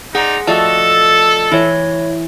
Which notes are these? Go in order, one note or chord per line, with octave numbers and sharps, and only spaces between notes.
D#4 G#4 C5 D5 F#5 A#5
F3 A3 F#4 A4 D5 D#5 A5
E3 E4 C#5